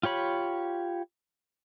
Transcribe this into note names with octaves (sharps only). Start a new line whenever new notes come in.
F4 G4 C#5 B5